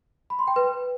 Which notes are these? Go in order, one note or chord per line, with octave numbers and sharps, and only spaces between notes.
B5
C6
G5
B4